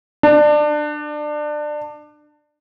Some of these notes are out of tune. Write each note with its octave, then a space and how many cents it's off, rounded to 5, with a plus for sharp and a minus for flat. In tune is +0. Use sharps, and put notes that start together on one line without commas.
D4 +25